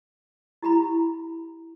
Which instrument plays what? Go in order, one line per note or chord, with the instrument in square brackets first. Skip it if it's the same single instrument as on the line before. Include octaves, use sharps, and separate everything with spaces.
[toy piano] E4 G4 A#5 B5